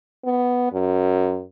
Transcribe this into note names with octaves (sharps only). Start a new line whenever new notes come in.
B3
F#2